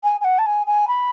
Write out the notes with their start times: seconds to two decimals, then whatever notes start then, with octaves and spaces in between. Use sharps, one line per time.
0.03 G#5
0.20 G#5
0.24 F#5
0.38 A5
0.46 G#5
0.66 G#5
0.87 B5